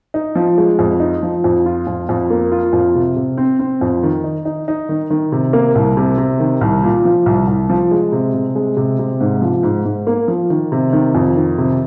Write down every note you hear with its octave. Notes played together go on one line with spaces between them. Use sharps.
D#4
F3
G#3
F2
D#4
F3
F2
F4
F2
F2
A#3
F4
F2
C3
C3
C4
C4
F2
D#3
D#4
D#4
D#4
D#3
D#3
C3
A#3
C2
C3
C3
D#3
C2
A#2
F3
C2
C2
F3
G#3
C3
C3
G#3
C3
C3
G#2
F3
G#2
G#2
A#3
F3
D#3
C3
D#3
F2
D#3
C3